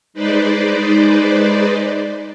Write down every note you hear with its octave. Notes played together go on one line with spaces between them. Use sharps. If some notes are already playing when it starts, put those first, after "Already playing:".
G#3 D#4 B4 C5 D5